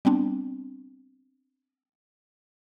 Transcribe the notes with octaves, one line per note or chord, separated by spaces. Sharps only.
G3 B3 C4 D4